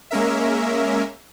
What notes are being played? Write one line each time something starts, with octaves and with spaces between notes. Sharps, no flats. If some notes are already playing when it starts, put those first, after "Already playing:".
G#3 A#3 C#4 A#4 E5